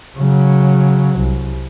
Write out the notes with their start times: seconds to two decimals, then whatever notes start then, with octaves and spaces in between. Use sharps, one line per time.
0.18 C#3 F#3
1.19 C2